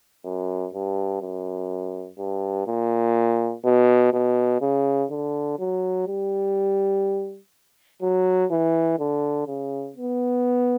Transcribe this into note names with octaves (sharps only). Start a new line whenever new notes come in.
F#2
G2
F#2
G2
A#2
B2
B2
C#3
D3
F#3
G3
F#3
E3
D3
C#3
B3